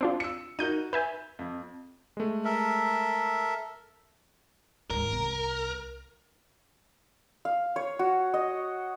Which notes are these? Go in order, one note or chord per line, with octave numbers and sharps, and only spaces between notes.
C4 D4 F4
E6 C#7
D#4 F#4 A#4 G6 D#7
B4 E5 G#5 G6
F2
G#3 A3
A4 A#4 E5
D#2 G#2 A#4
C2 C4
F5
C#5
F#4
D#5